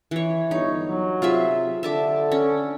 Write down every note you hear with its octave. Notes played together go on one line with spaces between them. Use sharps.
E3 C#5
G1 D#4 C#5
F#3
C3 F4 G#4 E5
D3 A4 E5 A5 D6
C#4